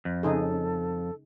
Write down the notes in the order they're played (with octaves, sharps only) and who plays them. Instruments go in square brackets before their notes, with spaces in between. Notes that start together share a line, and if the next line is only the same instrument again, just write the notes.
[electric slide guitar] F2
[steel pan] C#3 D#4 G#4 [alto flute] A4